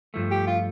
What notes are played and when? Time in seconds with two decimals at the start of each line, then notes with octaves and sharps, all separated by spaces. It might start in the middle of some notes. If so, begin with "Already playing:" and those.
0.14 G2 F3 A3
0.31 G4
0.47 F4